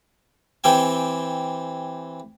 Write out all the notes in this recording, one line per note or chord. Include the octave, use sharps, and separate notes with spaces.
E3 C4 G4 G5 G#5